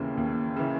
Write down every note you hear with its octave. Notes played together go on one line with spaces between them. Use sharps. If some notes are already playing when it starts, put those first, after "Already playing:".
Already playing: D#2 C#3 E3 A#3 C#4
D#2
C#3 E3